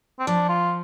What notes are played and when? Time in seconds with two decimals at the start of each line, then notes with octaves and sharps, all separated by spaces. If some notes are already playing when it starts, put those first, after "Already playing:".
0.19 C4
0.27 F3 D4
0.49 F4